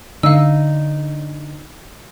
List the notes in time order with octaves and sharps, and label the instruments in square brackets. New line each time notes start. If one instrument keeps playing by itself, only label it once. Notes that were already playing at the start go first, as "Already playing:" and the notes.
[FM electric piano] D3 [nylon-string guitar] D#4 [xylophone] F5 E6